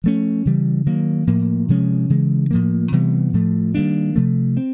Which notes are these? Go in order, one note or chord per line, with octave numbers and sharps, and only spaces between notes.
F3 A3 C#4
C#3 E3 G3
D#3 F#3 A#3
A2 F3 A#3
C3 F3 G#3 C#4
C#3 E3 G#3
A2 F3 A#3
C3 E3 G3 B3
A2 F3 A3
D#3 G3 A#3 D4
C3 F3 A3
C4